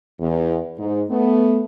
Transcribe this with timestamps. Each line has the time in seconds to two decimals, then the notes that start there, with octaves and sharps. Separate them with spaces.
0.20 E2
0.79 G#2
1.09 A3 B3